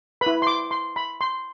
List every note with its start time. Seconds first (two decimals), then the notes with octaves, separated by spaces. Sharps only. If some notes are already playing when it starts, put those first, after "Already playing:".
0.21 B4 B5
0.26 E4
0.42 C6
0.47 D6
0.71 C6
0.96 B5
1.21 C6